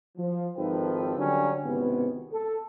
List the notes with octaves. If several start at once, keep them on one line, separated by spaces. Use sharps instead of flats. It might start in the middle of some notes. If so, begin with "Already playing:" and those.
F3
G#1 D#3 F3 A4 B4 G5
D3 F#3 G3 C#4 D4 D5
G#1 C#2 C3 B3
A4